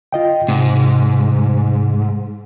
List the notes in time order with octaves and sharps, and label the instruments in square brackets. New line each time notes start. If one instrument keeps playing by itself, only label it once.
[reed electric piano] F4 D#5 G5
[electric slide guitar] G#2 [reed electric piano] C3